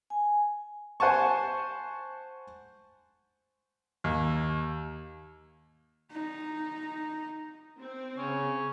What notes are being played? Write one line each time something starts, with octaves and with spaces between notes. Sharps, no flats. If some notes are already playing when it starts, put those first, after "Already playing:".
G#5
C5 F#5 G#5 A5 C#6
D#2
D#4
C4
C#3 C#4